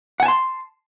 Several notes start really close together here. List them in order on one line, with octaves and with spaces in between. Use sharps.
F#5 G#5 A5 C6